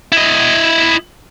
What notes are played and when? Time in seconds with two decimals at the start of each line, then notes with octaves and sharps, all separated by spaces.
0.12 E4 D#5